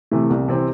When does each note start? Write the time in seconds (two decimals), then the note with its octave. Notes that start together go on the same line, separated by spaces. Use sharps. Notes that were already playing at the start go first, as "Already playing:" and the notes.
0.11 C3 E3 A3
0.30 C2
0.48 C3 E3 C4